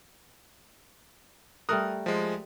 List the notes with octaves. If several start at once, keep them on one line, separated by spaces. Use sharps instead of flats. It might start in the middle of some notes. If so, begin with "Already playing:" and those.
G3 A3 A#4 D#6 F6 F#6
F3 G#3